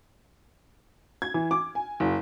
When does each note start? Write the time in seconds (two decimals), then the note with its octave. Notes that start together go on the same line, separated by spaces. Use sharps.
1.22 G#6
1.34 E3
1.51 D6
1.75 G#5
2.00 F#1